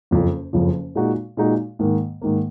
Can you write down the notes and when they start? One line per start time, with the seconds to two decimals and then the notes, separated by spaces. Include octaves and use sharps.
0.11 F#1 F2 C#3 F3
0.53 F#1 F2 C#3 F3
0.95 A#2 G#3 D#4 F#4
1.37 A#2 G#3 D#4 F#4
1.79 G#2 D#3 A#3
2.21 G#2 D#3 A#3